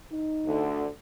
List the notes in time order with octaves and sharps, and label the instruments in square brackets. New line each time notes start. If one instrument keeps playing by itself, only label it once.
[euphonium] D#4
[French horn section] D2 D3